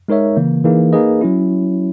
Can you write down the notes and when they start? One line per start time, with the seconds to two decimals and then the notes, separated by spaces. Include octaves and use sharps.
0.08 G#3 D#4 A#4 C#5 E5
0.36 C#3 E3 A#3
0.64 E3 A#3 D#4 G#4
0.93 A#3 D#4 G#4 B4 D#5
1.21 F#3 C#4 E4